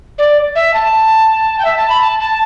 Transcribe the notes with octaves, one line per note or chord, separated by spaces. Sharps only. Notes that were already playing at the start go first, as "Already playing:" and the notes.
D5
E5
A5
G5
E5
A5
B5
A5
A5